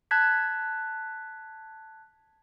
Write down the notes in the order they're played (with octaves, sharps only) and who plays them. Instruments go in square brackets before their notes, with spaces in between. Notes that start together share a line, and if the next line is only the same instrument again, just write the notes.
[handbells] A5 F#6 G#6 B6